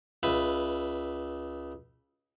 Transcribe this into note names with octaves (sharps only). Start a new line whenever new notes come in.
C#2 B4 E5